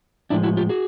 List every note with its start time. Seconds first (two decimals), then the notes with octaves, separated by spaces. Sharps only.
0.30 A2 F3 G#3 D4 E4
0.43 E4 F#4
0.57 F4 G4
0.69 F#4 G#4